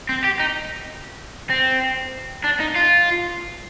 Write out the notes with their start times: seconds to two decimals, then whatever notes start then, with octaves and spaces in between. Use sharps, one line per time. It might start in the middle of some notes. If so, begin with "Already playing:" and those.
0.09 C4
0.24 G4
0.40 D#4
1.50 C4
2.44 D4
2.60 D#4
2.75 F4